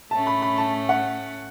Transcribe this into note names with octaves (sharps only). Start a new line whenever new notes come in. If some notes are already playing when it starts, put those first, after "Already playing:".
A2 A3 C#4 A5
B5
B5
A5
F#5